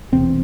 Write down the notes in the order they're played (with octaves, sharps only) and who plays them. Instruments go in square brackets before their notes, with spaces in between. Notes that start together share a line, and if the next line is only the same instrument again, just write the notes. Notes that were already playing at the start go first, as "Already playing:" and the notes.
[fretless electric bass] E1 E2 C3 C4